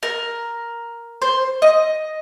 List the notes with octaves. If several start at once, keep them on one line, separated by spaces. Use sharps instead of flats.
A#4
C5
D#5